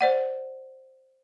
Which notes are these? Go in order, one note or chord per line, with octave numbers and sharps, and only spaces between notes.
C5 D5 F#5